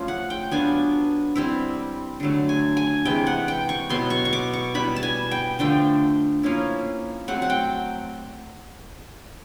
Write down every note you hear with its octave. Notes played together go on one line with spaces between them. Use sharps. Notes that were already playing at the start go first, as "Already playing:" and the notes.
Already playing: F3 A3 C#4 F4
F#5
G5
F#3 B3 D4 F4 G#5
G3 C4 E4
D3 F#3 A3
G#5
G#5
C3 E3 G#3 G5
F#5
G5
C#6
B2 F#3 B3 E4 C6
C#6
C#6
D6
C#6
G3 B3 E4 B5
A5
G#5
G5
D3 F3 A3 G5
F3 A#3 C#4 E4
F#3 A3 C4 F#5
F#5
G5